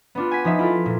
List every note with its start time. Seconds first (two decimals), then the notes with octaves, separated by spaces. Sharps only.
0.15 B3 D4 F4
0.31 G#5 B6
0.45 F3 D#4 E5
0.59 E4 F4 A4
0.86 A#2